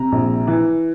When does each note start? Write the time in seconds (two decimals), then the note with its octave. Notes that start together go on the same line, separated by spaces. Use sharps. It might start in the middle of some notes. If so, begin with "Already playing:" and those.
Already playing: C3 A#5
0.12 A#1
0.47 E3